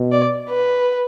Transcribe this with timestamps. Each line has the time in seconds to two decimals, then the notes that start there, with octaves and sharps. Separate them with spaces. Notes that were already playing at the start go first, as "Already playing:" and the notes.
Already playing: B2
0.12 D5
0.50 B4